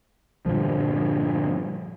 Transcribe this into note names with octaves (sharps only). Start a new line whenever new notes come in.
G2 A#2 D3 F3